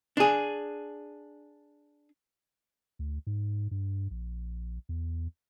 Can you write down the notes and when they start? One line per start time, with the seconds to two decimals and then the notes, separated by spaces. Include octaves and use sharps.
0.17 D4 G#4
2.99 D2
3.27 G#2
3.71 G2
4.11 A#1
4.89 E2